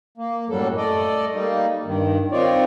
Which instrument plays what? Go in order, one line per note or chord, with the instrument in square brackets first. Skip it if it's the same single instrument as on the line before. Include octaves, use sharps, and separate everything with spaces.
[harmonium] A#3
F#2 A2 F#3 G3 A4
A3 A4 D5 D#5
G3 A#3 D#4
G2 D#3
C4 D#4 F4 A#4 C#5 D5